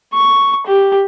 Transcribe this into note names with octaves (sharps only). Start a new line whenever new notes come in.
C#6
G4